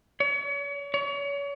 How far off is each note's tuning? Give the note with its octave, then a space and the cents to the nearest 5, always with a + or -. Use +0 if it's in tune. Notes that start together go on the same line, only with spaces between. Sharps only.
C#5 +40
C#5 +35